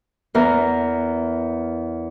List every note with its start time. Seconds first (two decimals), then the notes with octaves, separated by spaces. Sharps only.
0.35 E2 E3 A#4